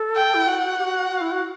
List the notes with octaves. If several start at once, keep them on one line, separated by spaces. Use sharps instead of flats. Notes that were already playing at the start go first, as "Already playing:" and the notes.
Already playing: A4
G5
E4
F#4 F#5
F#4
G4
F#4
F#4
E4
F#4